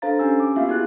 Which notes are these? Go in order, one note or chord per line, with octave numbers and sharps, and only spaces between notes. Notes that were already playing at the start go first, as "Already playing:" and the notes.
D4 A4 C5 F5 A#5 A6
C#4 G4 G#5 E6
D6
A#3 B3 F4 G4 E5 F5
D#4 E4 F#4 G#4 E5 F#6